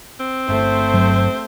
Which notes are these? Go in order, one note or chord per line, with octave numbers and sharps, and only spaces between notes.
C4
G1 A3 C5
G2 F#3